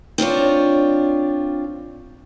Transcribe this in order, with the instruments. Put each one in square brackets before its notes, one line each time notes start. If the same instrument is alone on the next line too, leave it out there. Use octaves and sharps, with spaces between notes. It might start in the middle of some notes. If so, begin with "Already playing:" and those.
[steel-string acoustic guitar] C4 D4 F4 C#5